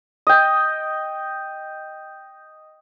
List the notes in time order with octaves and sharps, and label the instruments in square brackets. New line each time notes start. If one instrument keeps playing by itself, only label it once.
[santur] D#5 G5